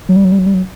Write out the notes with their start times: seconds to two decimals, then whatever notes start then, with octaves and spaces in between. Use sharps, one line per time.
0.09 F#3
0.16 G3
0.24 F#3
0.32 G3
0.39 F#3
0.46 G3
0.54 F#3